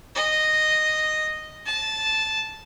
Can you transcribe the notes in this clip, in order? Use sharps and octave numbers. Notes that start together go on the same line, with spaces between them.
D#5
A5